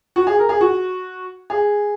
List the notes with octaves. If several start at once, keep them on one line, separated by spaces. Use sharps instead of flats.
F#4
G#4
A#4
G#4
F#4
G#4